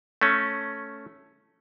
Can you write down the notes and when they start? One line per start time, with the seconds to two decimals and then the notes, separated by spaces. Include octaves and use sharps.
0.21 A3 C#4